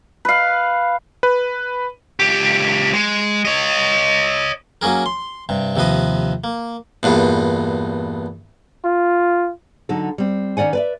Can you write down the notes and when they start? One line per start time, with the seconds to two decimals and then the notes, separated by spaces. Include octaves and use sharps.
0.25 B4 F5
1.23 B4
2.20 C#2 G4
2.94 G#3
3.45 C#5 D#5
4.82 F#3 A#3 C#4 G#4 A#4
5.06 C6
5.49 G2 C3
5.76 D#2 C3 F3 B4 D#5
6.44 A#3
7.03 E2 G2 A#2
8.85 F4
9.89 D3 F#3 D#4 A4
10.18 G3 C4
10.57 D#3 C#4 D5 F#5 G#5
10.73 B4 D5 E5